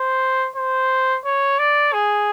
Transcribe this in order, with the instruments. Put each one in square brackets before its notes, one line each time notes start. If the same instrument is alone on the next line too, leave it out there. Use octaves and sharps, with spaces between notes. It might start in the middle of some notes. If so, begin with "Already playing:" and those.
Already playing: [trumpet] C5
C5
C#5
D5
G#4